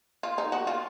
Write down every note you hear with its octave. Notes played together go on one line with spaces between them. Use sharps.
F4
D#4
F#4
F4